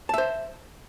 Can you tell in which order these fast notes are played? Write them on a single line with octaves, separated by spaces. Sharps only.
A5 E5 C5